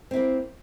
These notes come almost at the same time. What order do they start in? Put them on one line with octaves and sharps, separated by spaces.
C4 E4 A#3